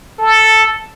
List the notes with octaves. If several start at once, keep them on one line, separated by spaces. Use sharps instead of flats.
A4